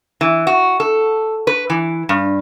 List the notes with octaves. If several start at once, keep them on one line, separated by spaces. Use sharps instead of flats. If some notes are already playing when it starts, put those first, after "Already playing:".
E3
F#4
A4
B4
E3
G2